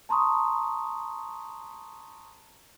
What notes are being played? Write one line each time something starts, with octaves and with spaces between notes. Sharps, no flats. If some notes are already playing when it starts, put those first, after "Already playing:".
A5 A#5 C6 C#6 D#6